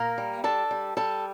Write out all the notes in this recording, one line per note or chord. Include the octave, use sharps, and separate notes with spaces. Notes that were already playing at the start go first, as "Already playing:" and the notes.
Already playing: A#2 A#3 A#4
G3
D4 A4 A5
G3
G3 A4 A5